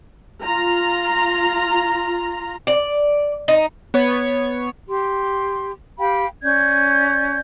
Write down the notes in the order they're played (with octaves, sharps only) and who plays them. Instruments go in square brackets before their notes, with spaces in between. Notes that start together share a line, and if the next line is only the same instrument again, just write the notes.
[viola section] F4 A#5
[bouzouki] D5
D#4
[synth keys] B3 C#5 C#6
[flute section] G4 C6
G4 F5 G5 B5
C#4 D5 G6 G#6